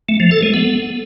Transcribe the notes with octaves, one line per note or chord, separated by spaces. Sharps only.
A3
F3
A4
G#3
B3